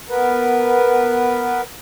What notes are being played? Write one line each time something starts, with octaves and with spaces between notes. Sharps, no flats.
B3 A#4 B4